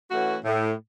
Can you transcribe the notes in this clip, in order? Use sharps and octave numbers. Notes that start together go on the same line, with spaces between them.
E3 A3 C#4 F#4
A2